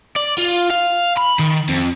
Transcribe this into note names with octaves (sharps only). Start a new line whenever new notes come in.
D5
F4
F5
B5
D#3
F2